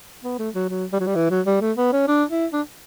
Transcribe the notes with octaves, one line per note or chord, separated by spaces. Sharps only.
B3
A3
F#3
F#3
G3
F#3
G3
E3
F#3
G3
A3
B3
C#4
D4
E4
D4